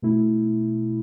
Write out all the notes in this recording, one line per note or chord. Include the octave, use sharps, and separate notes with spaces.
B2 A3 E4